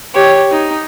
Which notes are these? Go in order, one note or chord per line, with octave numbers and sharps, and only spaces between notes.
G4 C#5
D#4